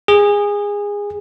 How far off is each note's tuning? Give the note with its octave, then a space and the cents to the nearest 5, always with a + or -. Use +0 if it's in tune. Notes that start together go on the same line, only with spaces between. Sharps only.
G#4 -20